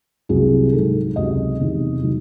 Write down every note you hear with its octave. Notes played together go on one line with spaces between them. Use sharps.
C2 C3 F#3 G#4
G#2 D#3 F#3 A4
C#2 C3 F#3 D#5
E2 C3 D#3
D#3 F#3